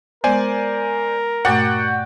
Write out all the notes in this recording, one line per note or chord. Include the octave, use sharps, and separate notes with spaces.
G#3 B3 A#4 C5 D5 G#5
G2 A#2 A3 F#4 D5 F#5 G5